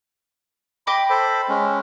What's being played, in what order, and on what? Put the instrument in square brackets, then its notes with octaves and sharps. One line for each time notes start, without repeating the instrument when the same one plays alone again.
[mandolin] D#5 G5 D6 [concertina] B5
[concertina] A4 C5 B5
G#3 C#4